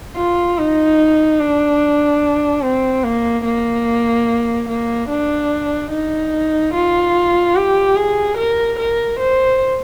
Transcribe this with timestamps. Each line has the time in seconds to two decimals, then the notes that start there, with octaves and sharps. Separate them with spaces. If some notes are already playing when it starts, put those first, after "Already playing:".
0.17 F4
0.58 D#4
1.40 D4
2.63 C4
3.04 A#3
3.45 A#3
4.69 A#3
5.10 D4
5.91 D#4
6.74 F4
7.56 G4
7.96 G#4
8.37 A#4
8.79 A#4
9.20 C5